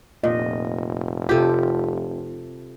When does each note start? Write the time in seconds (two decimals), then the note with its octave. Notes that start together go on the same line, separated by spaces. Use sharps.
0.24 F1 A#2 D#5
1.29 C3 F4 G4 A4